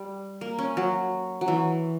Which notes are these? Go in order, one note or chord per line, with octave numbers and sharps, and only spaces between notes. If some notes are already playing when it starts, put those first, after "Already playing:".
Already playing: G3
A#3
C#4
F#3
F#3
E3